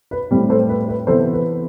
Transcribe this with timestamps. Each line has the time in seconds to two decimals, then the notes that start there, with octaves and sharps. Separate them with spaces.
0.11 B4
0.31 A2 G3 C4
0.50 A4 C5
0.69 B4
0.88 B4
1.07 C3 E3 B3 A4 C5
1.33 B4